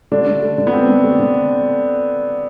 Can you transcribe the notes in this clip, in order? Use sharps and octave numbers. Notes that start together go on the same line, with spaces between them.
D3 A3 D4
D3
A3
D3
B3
A3 C4
D3
A3
D3